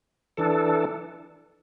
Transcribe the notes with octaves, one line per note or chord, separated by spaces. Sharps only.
E3 D4 A4